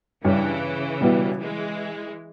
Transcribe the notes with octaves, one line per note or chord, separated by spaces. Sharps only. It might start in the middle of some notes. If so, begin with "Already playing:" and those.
G2 C#3 E3 G3 C#4
B2 G3 B3 E4
E3 G#3